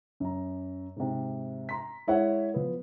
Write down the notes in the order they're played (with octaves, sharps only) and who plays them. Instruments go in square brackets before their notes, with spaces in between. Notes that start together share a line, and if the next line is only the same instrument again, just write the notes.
[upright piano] F#2 A#5
G#2 C3
A#5 C6 B6
G#3 E4 C#5 F#5
F3 B3